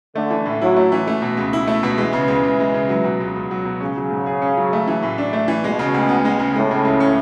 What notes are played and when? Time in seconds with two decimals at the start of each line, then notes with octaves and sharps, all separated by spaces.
0.15 D3 A3
0.30 E3
0.46 A2
0.61 F#3 E4
0.76 A3
0.92 E3
1.07 A3
1.22 B2
1.37 C#2
1.53 E4
1.67 A3
1.83 B2
1.98 E3 G#3
2.13 C#3
2.28 C#2
2.43 C#2
2.60 G#3
2.74 C#3
2.89 F#3
3.04 B2
3.20 C#2
3.36 C#2
3.51 F#3
3.65 B2
3.80 C#3 C#4
3.97 F#3
4.11 G#2
4.26 G#4
4.42 C#4
4.57 F#3
4.73 A3
4.87 E3
5.03 A2
5.18 D4
5.33 A3
5.48 E3
5.64 B2 G#3
5.79 C#3
5.94 D2
6.09 B3
6.25 G#3
6.39 C#3
6.55 A2 G#3
6.71 C#3
6.85 C#2
7.00 C#4